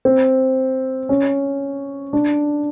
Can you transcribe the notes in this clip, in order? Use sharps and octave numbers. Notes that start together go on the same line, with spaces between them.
C4
C#4
D4